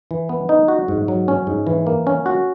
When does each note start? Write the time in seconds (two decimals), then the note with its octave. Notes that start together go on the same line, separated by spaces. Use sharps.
0.11 E3
0.29 B3
0.49 D#4
0.68 F#4
0.88 G#2
1.08 F#3
1.28 C#4
1.47 G#2
1.67 E3
1.87 A#3
2.07 C#4
2.26 F#4